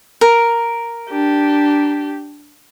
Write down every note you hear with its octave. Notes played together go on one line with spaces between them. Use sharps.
A#4
D4 G4